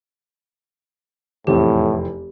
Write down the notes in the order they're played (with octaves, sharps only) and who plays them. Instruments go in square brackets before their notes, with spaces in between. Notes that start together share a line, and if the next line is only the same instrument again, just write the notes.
[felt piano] F1 E2 C4 [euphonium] A2 [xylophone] G4